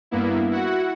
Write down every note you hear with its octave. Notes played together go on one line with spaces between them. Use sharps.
G2 A#3 B3 E4
E4 F#4 F#5